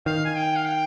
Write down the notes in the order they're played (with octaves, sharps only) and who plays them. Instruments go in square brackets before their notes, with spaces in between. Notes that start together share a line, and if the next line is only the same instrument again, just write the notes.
[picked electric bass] D#3 [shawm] F5
[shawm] G#5
G5
F5
G5